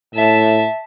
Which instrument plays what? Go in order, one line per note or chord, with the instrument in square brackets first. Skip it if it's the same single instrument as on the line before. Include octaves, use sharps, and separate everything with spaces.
[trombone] A2 [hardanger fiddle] E5 A5